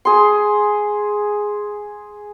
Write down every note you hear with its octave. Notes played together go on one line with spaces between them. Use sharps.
G#4 C6